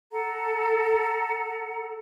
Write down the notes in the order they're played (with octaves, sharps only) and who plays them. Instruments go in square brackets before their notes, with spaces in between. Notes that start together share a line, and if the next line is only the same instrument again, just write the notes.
[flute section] A4 F#5 A#5